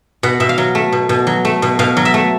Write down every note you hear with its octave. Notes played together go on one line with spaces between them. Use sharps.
B2 F#5
B2 E5
F5
F#3
A3
B2
B2
F#3
A3
B2
B2 F5
F#3
E5
A3